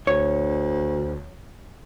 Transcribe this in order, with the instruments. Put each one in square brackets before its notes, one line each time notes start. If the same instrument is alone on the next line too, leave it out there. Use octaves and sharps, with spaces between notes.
[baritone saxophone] D2 [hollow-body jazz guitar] C#5